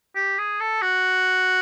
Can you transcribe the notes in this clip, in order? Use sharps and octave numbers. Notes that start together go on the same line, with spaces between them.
G4
G#4
A4
F#4